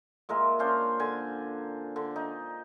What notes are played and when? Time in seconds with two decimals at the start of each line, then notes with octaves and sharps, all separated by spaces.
0.29 A#2 G#3 A#4 E5
0.59 C#4 D4 C5 F5
1.00 D3 G#5
1.96 D3
2.16 D#4